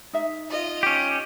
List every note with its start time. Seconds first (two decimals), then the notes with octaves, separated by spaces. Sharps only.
0.13 D#4 E5
0.50 F4 D#5
0.83 C#4 G4